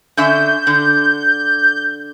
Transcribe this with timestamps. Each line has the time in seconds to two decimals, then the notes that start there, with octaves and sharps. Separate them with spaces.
0.17 D3 C#4 E5 G6
0.67 D3